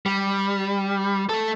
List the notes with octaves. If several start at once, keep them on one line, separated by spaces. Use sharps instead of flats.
G3
A3 A4